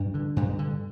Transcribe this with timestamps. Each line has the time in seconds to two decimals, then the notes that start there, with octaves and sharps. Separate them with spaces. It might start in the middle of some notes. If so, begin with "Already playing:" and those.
Already playing: G2 D4
0.14 D3
0.36 G2
0.59 D3